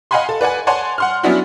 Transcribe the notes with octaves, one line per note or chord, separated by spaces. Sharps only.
D#5 F5 F#5 G#5 B5 C6
A4
B4 D5 F#5 G#5
C#5 D5 F#5 G#5 A5 C6
F#5 C6 F6
F#3 B3 C#4 D4 E4 F#4